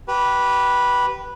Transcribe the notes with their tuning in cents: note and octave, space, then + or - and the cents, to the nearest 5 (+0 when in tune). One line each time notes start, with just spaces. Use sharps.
G4 -25 B4 -10